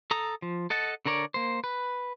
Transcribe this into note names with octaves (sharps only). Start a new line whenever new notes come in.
A4 A#5 D#6
F3
A4 D#5 F#5 A5
D3 D4 A#4 C#5 D5
A#3 C5
B4